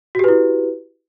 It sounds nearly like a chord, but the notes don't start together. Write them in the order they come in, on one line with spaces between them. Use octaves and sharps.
F#4 G4 B4 E4